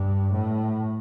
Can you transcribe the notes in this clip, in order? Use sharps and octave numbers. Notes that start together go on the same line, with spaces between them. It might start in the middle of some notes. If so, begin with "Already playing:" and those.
Already playing: G2
A2